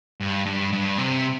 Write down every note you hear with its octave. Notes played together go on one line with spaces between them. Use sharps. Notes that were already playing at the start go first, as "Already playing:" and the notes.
G2
G2
G2
C3